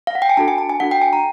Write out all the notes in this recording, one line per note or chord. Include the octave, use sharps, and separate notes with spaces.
F5
F#5
G5
G#5
D4 F#4 A4 A5
G#5
A5
G#5
D4 F#4 A4 F#5
G5
G#5
A#5